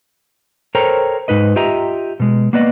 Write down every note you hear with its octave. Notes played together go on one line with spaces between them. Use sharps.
A4 A#4 C5 C#5 G5 A#5
G#2 D#4 B4 D#5
F4 G4 D#5 E5 A#5
B2 G#3
A#3 B3 B4 D5 D#5